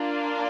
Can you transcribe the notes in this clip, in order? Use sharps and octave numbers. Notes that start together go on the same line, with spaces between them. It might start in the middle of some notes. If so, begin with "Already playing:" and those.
Already playing: A#3 D4 F4